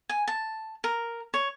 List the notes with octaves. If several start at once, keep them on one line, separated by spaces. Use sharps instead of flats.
G#5
A5
A#4
C#5